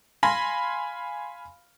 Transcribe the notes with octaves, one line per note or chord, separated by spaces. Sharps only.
F5 G#5 B5 C6 A#6